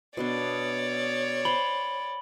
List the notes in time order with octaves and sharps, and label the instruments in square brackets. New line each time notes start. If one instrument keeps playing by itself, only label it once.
[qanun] B2 B3 D4 [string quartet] C#5 D5
[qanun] C5 G5 [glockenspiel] B5 F#7 G7